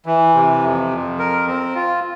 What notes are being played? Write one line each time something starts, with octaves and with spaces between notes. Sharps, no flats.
E3
C3
F2
F2
A#4
C4
F4